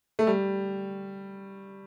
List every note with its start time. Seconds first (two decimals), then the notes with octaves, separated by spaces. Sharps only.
0.19 A3
0.27 G3